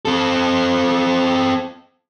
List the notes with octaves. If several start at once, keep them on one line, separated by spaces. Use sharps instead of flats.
C4 A4